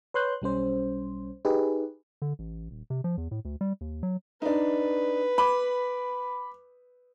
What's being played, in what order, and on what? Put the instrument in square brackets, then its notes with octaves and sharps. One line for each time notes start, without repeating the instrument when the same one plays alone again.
[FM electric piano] B4 C#5 C6 F#6 G6
B1 G3 C#4 C5
D#4 G4 G#4 B4
[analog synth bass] D3
A1
D#1
C3
F3
E2
A2
D2
G3
D#2
F#3
[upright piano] D4 D#4 [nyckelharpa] B4
[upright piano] B5 D6